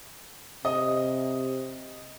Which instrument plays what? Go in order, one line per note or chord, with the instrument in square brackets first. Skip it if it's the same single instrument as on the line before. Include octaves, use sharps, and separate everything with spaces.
[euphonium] C3 [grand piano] D#5